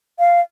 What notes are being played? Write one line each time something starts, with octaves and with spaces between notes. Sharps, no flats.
F5